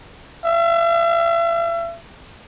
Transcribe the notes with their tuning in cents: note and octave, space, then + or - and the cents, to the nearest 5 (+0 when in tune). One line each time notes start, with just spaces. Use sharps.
E5 +40